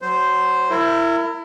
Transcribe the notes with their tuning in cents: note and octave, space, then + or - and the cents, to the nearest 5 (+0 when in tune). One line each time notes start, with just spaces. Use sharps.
F#3 +15 C5 -5
E4 +20 A#4 -30